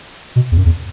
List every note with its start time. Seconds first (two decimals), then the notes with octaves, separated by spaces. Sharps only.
0.36 B2
0.52 E2
0.58 F#2
0.65 E2